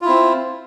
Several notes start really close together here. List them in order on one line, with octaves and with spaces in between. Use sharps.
F4 E4 C4